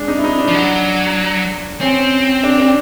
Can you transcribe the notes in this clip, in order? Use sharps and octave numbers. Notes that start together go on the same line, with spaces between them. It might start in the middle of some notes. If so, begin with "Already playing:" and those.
Already playing: G#3 D4
D#4
E4
D#4
D4
F3
F#3
C4 C#4
D4
D4